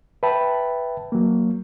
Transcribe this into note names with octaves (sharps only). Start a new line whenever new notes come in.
B4 E5 G5 A5 B5
F#3 A#3